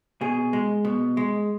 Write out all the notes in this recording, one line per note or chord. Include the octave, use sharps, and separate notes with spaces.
B2 G#4
G#3
B2
G#3